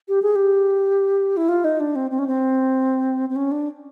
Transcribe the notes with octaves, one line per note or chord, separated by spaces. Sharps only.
G4
G#4
G4
E4
F4
D#4
D4
C4
C4
C#4
C4
C4
C#4
D4